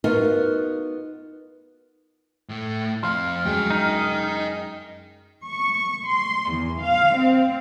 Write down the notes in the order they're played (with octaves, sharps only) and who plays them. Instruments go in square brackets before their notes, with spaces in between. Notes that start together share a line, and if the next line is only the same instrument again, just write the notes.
[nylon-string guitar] B3 D#4 F4 F#4 A#4
[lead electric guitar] A2 A3
[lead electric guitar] F2 F5 [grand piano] C6 [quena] F6
[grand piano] F#2 G#3 [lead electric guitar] D#5 G5
[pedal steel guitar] D#4
[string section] C#6
C6
E2
F5
C4